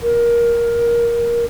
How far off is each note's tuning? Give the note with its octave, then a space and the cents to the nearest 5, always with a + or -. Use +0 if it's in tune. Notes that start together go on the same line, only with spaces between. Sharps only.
A#4 +15